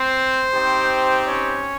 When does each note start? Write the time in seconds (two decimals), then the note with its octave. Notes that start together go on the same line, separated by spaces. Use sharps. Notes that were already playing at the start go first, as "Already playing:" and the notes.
Already playing: C4 C5
0.53 C4 D#4 G4
1.27 C#4 C#5